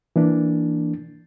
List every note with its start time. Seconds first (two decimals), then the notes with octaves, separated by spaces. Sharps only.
0.16 E3 A#3 D4